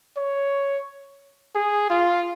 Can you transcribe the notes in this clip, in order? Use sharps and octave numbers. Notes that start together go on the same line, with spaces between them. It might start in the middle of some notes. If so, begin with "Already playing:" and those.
C#5
G#4
F4